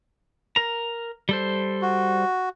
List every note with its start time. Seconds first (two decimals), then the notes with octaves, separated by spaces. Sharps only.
0.56 A#4 A#5
1.29 G3 A4 C5
1.82 F#4